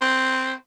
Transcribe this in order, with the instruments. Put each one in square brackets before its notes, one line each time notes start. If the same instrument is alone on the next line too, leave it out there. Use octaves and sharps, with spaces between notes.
[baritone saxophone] C4